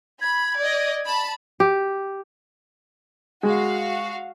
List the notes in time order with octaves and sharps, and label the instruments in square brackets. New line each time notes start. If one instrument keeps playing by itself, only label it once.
[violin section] B5 [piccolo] G#6
[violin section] D5 D#5
A5 B5
[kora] G4
[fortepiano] G#3 [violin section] F#4 F5